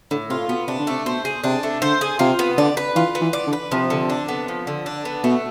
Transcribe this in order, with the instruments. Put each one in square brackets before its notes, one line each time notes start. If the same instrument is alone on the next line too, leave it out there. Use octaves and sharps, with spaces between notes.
[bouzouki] A2 [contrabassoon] D3
[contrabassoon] C3 [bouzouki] F4
[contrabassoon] B2 [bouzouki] B3
[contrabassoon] C3 [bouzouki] D4
[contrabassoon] D3
[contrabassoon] C3 [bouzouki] A3
[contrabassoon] B2 [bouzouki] C5
[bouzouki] G#4
[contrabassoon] C3 [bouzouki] D4
[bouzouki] A3
[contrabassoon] D3 [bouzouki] C5
[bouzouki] G#4
[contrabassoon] C3 [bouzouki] F4
[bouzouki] B3
[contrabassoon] D3 [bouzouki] D5
[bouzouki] B4
[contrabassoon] E3 [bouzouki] F4
[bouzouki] B3
[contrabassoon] E3
[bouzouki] D5
[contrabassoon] D3
[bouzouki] B4
[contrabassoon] C3 [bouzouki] F3
[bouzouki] D3
D4
B3
F3
D3
D4
B3
[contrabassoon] B2 [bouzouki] A3